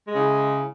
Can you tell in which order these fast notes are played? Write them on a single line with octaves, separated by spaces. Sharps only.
G#3 C#3 E4